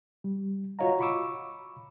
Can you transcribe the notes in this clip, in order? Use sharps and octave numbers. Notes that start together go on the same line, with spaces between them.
G3
F4 F#4 C#5 D#5 F5 A#5
B5 C#6 D6 E6